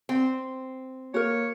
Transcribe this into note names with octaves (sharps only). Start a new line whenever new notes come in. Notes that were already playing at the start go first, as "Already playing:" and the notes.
C4
A#3 F#4 A#4 C#5